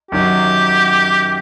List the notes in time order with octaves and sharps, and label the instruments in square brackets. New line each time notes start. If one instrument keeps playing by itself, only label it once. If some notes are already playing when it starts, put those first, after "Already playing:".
[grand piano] F#2 D#3 F#3 [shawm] G4